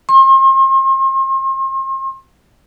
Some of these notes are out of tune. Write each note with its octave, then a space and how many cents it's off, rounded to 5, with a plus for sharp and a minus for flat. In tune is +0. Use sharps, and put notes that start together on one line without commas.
C6 +40